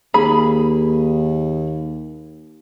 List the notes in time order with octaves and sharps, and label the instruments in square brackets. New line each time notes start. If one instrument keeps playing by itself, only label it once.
[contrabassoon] D#2 [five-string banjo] G#4 B5